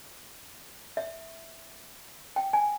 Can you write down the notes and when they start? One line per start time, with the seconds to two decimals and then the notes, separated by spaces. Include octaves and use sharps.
0.97 E5
2.36 G5
2.53 G#5